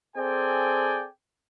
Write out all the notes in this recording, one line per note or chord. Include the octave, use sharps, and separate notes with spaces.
C4 G#4 A4 D5 G5 G#5